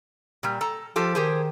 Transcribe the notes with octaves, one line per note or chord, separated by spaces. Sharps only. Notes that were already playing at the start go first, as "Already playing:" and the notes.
A#2 G3
A4 A#5
F3 F4 G4 A4
D#3 G4 G#4 C5